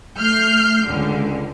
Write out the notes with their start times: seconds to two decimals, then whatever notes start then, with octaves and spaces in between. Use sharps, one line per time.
0.18 A3 F6 G6 C7
0.86 C#2 D3